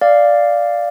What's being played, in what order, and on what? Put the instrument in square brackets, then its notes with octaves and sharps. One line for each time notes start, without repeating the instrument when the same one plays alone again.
[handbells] D5 F5